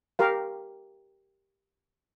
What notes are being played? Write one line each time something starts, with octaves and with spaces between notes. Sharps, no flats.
G4 A#4 F5